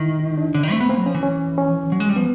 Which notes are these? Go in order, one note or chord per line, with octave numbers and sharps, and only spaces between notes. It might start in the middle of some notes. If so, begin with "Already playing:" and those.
Already playing: D#3 E4
D#4
D4
D3 C#4
D#3
A3 C4
B3
A#3 C4
F#3
F3 C#4
E3
C#4
C#4
F#3
G#3
G3
F3 B3